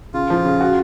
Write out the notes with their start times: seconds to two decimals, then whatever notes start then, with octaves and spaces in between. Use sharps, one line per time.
0.14 C#3 F4
0.30 F3
0.45 C#3
0.61 F#4